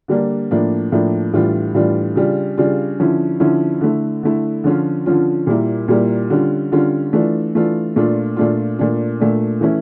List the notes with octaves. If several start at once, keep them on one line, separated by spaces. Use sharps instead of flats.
D3 G3 A#3 D4
A2 F3 A#3 D4
A2 F3 A#3 D4
A2 E3 G3 D4 F4
A2 E3 G3 D4 F4
C#3 G3 D4 F4
C#3 G3 D4 F4
D3 F3 C#4 E4
D3 F3 C#4 E4
D3 A3 E4
D3 A3 E4
D3 F3 C#4 F4
D3 F3 C#4 F4
A#2 G3 A#3 E4
A#2 G3 A#3 E4
D3 G3 C#4 F4
D3 G3 C#4 F4
E3 A3 D4 F4
E3 A3 D4 F4
A#2 A3 D4 F4
A#2 A3 D4 F4
A#2 A3 D4
A#2 A3 D4
E3 A3 C#4 E4